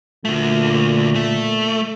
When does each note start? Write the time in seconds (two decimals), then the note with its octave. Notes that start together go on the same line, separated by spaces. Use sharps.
0.25 D2 A#2 A3
1.15 A3